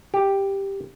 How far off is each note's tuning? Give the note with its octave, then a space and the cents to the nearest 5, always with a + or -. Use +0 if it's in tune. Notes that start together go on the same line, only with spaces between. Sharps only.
G4 +5